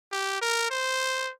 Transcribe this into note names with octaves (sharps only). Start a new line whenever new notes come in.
G4
A#4
C5